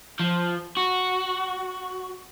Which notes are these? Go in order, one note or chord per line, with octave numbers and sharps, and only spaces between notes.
F3
F#4